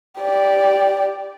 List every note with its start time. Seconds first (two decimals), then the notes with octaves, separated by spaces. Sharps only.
0.20 G4 D5